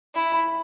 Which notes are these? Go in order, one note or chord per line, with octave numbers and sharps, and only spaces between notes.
E4 B5
B5